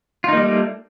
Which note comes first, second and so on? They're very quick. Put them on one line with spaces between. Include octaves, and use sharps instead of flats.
F4 D#4 A#3 G3 A3